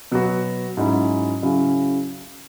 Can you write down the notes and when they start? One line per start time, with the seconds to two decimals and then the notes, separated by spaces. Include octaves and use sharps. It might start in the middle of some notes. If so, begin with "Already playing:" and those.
0.12 B2 F#3 B3 F#4
0.77 G#2 F#3 C#4 E4
1.42 C#3 F#3 C#4 E4